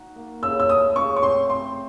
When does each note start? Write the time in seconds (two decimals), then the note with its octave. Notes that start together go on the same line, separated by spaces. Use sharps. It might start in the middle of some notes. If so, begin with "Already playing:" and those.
Already playing: D#4 F#4
0.16 A#3
0.43 C#3 E6
0.60 E6
0.69 A3 D#6
0.96 C#3 C#6
1.17 C#6
1.22 C4 C6
1.49 C4 C6